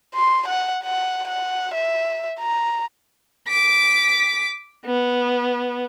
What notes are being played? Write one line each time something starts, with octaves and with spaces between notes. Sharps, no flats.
C6
F#5
F#5
F#5
E5
A#5
D6 B6
B3